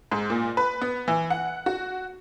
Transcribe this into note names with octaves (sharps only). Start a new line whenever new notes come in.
G#2
A#2
B4
B3
E3
F#5
F#4